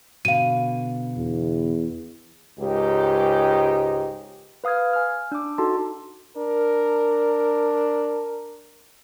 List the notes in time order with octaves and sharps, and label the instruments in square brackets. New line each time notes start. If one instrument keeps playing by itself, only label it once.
[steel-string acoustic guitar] B2 D3 [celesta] F5 D#7
[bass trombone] E2
[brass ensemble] C#2 G#2 D#4 G4
[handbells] B4 F5 D#6 F6 G#6
G#5 F6
D4 D6
D#4 F#4 A4 A5 C6
[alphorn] D4 [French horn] A#4